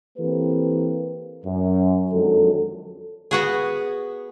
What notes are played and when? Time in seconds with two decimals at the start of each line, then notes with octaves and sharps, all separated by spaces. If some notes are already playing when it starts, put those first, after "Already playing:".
0.18 E3 A#3 C4 G4 A4 B4
1.45 F#2
2.12 F2 D3 D#3 F#3 G#3 A4
3.31 B3 F#4 G#4